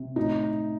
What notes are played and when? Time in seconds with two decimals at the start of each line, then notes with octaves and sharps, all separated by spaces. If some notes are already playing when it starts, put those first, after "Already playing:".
Already playing: C3
0.16 A2 D#4